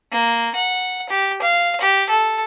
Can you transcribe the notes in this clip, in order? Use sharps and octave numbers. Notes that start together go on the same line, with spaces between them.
A#3
F#5
G4
F5
G4
A4